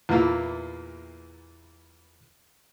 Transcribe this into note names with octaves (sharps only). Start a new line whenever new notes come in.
E2 A#2 E3 A#3 E4 F5